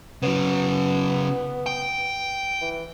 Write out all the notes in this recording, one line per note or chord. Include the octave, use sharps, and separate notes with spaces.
C#3 F#3 B3
G5
E3